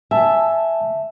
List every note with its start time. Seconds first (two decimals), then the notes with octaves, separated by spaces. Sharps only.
0.11 E5 G#5 A5